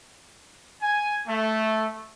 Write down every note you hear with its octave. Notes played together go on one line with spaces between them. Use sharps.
G#5
A3